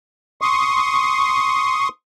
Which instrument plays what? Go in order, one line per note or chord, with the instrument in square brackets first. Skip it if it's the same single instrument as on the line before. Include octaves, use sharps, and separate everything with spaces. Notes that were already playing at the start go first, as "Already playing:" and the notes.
[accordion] C6 C#6 D#6